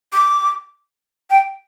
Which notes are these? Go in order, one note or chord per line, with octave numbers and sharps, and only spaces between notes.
D6
G5